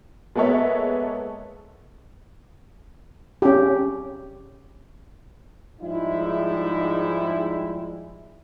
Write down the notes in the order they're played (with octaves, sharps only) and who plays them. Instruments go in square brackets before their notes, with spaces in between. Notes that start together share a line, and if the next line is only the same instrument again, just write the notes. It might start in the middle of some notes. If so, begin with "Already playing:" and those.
[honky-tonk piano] G#3 A#3 B3 A4 C#5 E5
[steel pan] C#4 G4
[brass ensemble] G#2 F3 G3 G#3 D#4 E4